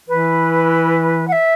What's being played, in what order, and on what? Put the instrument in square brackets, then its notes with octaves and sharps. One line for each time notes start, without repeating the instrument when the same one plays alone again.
[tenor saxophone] E3 [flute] B4
[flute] F#5
E5